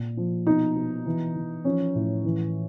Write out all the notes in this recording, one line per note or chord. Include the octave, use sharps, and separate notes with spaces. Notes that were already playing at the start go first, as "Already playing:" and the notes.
Already playing: A#2
F3
B2 D#4
B2
E3
E3
F3 C#4
A2
E3